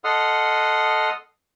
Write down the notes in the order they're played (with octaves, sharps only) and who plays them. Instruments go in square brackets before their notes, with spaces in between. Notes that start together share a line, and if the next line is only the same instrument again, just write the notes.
[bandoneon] A4 D#5 F#5 C6 D#6 F6